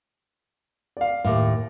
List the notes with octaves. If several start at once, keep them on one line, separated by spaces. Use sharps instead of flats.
D5 F5
D#2 A2 F5 D6